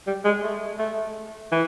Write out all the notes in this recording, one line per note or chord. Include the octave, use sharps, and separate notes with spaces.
G3
G#3
A3
A3
E3